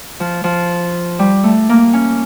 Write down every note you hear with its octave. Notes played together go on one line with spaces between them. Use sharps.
F3
F3
G3
A3
A#3
C#4